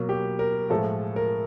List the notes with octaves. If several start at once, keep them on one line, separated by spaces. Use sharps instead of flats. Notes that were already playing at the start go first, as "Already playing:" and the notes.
Already playing: B2 F#3 A#3
G4
A#4
A2 F3 G#3 A4
A#4